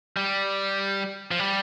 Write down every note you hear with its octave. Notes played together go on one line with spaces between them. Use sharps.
G3
F3
G3